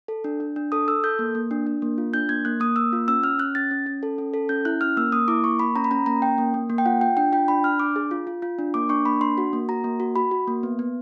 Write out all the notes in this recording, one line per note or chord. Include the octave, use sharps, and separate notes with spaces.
A4
D4
D4
D4
A4 D#6
A4 E6
A4 G6
A#3
A#3
D4
D4
A#3
F4
D4 G6
A#3 G#6
A#3 F#6
A#3 D#6
A#3 E6
F4
C#4 E6
C#4 F6
C#4 F#6
C#4 A6
C#4
C#4
A4
C#4
A4
C#4 G6
E4 F#6
C#4 F6
A#3 E6
A#3 D#6
E4 D6
A#3 C#6
A#3 B5
C#4 A#5
B5
C#4 A#5
A#3 A#5
C#4 G5
A#3
A#3
A#3
G5
F4 F#5
F4 G5
D4 G5
F4 G5
D4 B5
D4 F6
D4 D6
G#4
F4
F4
F4
D4
A#3 D6
D4 C#6
A#3 B5
D4 C6
F#4
A#3
F#4 A#5
A#3
F#4
F#4 B5
F#4
A#3
B3
B3